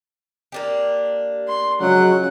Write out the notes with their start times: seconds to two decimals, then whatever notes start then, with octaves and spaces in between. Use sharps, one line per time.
0.52 A#3 D4 G4
1.48 C6
1.81 C#3 F3 F#3 G#3 F#5